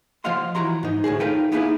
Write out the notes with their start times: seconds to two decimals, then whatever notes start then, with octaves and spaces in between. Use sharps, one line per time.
0.24 F3 F4 D#5 F5 F#5 C6
0.55 E3 E4 F#4 A#5 C6
0.83 G#2 D#4
1.04 D2 A2 D#3 G#4
1.20 D#4 F4 A4 B4 G5
1.52 A#3 B3 D#4 E4 G#4 B4